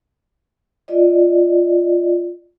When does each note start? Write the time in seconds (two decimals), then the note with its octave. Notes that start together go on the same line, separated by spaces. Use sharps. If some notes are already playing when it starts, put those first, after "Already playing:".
0.88 F4 D5 D#5